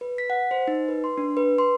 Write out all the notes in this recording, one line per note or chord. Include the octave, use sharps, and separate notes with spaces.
B4
B6
F#5
C5
D#4
B4
C6
D4
B4
C6